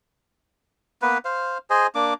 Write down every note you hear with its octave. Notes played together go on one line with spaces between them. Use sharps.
A#3 B3 B4
C5 F5
G#4 C5 D#5 G#5
A#3 D4 D6